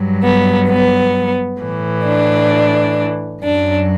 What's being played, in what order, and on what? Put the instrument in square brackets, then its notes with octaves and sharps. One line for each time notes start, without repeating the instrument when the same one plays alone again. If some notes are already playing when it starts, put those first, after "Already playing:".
Already playing: [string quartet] G2 F#3
B3
B3
A2 E3
D4
F#2 F#3 D4